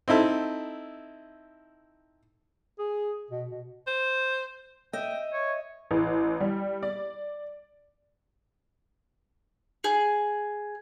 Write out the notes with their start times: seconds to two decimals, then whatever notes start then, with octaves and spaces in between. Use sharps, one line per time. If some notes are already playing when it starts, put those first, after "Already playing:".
0.08 C4 D#4 E4 A4
2.79 G#4
3.31 B2
3.51 B2
3.87 C5
4.93 D#5 E5 G5
5.33 C#5
5.91 A1
6.41 G3
6.83 D5
9.84 G#4